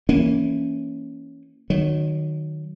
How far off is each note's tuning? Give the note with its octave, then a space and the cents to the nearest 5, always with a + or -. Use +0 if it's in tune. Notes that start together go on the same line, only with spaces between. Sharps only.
E3 +0 A#3 +0 C#4 +0
D#3 -25 F#3 +0